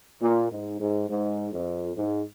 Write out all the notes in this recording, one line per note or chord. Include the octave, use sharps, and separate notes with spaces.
A#2
G#2
G#2
G#2
F2
G#2